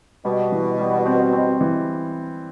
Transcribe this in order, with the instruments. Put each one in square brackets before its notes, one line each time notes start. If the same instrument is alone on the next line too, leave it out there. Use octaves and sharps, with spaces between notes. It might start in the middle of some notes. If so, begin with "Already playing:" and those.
[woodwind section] B2 [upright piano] G3
[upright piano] E3
G3
C4
C4
E3